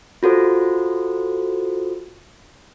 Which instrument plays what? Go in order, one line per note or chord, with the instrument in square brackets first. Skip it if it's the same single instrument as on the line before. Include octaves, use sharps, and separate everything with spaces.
[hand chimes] F4 F#4 A4 C5